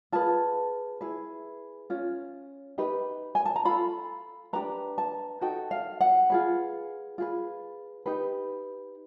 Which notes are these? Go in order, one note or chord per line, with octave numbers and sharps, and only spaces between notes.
F4 G#4 B4 A5
E4 G#4 B4
C#4 F4
D#4 G4 B4
G#5
A5
A#5
F4 A4 B5
D4 G4 B4 A#5
A5
D#4 F#4 A4 G5
F5
F#5
F4 G#4 B4
F4 G#4 B4
D#4 G4 B4